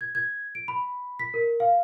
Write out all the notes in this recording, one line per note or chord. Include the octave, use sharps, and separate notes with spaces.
G#6
G#6
D7
B5
B6
A#4
F5